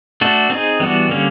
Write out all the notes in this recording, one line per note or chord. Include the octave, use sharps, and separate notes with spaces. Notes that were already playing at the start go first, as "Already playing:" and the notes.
A3 D4 F#4 A4
C4 D#4 G#4
E3 G3 B3 D4 F#4
D3 G3 A#3 C#4